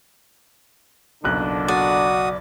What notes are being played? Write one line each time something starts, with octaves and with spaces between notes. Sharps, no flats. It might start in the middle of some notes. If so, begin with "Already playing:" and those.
F#1 B1 A#2 D3 D4 F#6
F#4 D5 D#6